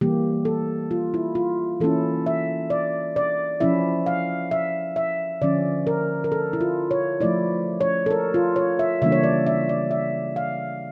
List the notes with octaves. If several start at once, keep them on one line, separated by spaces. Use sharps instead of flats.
E3 G3 A#3 G4
A4
F4
E4
F4
E3 A#3 C#4 E4 A4
E5
D5
D5
F3 C#4 E4 E5
F5
E5
E5
D3 F3 C#4 D5
A#4
A#4
A4
E4
F4
C#5
F3 A3 E4 D5
C#5
A4
A#4
F4
C#5
E5
C#3 E3 G3 A#3 D4 E5
C#5
D5
E5
D5
E5
F5